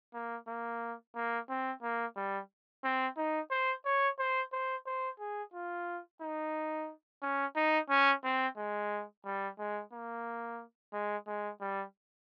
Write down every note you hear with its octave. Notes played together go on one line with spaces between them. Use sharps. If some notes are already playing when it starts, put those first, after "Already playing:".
A#3
A#3
A#3
C4
A#3
G3
C4
D#4
C5
C#5
C5
C5
C5
G#4
F4
D#4
C#4
D#4
C#4
C4
G#3
G3
G#3
A#3
G#3
G#3
G3